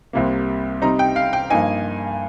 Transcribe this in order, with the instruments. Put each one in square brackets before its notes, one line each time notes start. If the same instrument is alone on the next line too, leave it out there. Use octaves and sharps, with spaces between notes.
[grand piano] C2 C3 G3 A#3
C3 G3 C4 D#4 A#5
G5
F5
G5
G2 F3 A#3 D#4 G#5